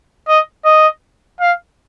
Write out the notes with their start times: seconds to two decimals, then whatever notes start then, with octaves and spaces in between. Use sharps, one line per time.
0.28 D#5
0.65 D#5
1.40 F5